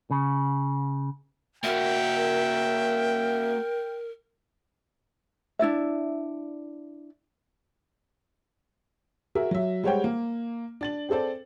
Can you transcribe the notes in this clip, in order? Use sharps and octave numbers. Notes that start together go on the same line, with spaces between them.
C#3
A#3 F#4 A#4 E5 G5
D4 E4 D5 E5
F#4 G#4 A#4 E5
F#3 E5
G3 G#3 C5 C#5 F#5 G5
A#3
D4 A6 F#7
C4 G#4 A4 C5 D5